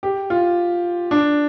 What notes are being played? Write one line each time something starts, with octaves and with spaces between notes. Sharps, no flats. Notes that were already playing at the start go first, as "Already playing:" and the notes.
G4
F4
D4